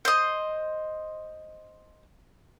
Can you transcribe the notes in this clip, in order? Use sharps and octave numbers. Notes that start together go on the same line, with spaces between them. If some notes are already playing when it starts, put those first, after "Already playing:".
C5 D#5